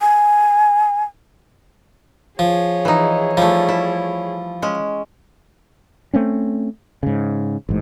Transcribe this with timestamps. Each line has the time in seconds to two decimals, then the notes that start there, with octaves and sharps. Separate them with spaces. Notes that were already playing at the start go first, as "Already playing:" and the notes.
0.01 G#5
2.39 F3 G#4 C#5
2.85 E3 D#4
3.37 F3 G3 A3
3.69 E4
4.62 G#3 C#4
6.14 A3 C4 C#4
7.03 G#2 C#3
7.69 A1 G#2